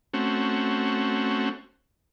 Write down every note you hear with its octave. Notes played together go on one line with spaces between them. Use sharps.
A3 C4 C#4 F#4